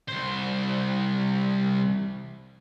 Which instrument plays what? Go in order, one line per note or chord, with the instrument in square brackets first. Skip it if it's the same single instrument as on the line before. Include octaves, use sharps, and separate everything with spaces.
[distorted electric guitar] C2 C5